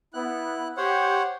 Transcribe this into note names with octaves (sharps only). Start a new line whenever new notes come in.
B3 E4 F#6
G4 C5 C#5 F#5